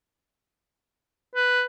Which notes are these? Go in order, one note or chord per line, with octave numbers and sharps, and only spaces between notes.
B4